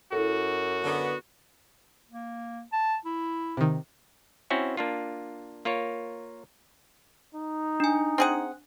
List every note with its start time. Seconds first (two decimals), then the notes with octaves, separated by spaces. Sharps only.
0.13 F#2 E4 F#4 A4
0.83 D3 B3
2.09 A#3
2.73 A5
3.06 E4
3.57 C3 D#3
4.50 C4 C#4 E4 F#4
4.77 A#3 D4 F4
5.65 A#3 F4 A#4 C#5
7.35 D#4
7.80 D4 G#5
8.18 C4 G#4 F#5